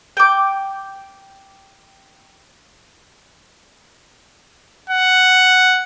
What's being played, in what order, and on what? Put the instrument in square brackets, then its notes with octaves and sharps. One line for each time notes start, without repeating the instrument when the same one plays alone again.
[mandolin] G5 D6
[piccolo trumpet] F#5